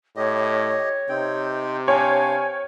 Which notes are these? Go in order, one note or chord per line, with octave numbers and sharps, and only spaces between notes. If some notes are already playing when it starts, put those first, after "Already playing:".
A2 G4 C#5 D#5
C3 C4 D#4 G5
D4 C#5 F5 G5 G#5